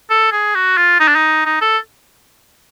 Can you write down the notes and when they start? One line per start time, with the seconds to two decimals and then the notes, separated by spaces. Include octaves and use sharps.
0.10 A4
0.32 G#4
0.55 F#4
0.77 F4
1.00 D#4
1.08 D4
1.15 D#4
1.46 D#4
1.62 A4